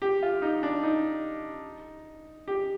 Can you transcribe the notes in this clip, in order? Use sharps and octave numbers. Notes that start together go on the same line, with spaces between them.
G4
F4
D#4
D4
D#4
G4